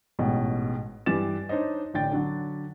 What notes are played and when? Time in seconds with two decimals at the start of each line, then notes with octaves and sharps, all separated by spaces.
0.19 A1 G#2 B2
1.06 G2 E3 G4 G#5 A6 E7
1.49 D4 D#4 C5 C#5 D#5
1.94 A1 D3 D5 G5 A6
2.11 D3 F#3 D4